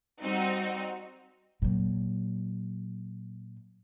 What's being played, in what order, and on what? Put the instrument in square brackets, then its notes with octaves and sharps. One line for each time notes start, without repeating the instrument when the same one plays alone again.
[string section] G3 C4 D#4 F#4
[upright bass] A#2 F#3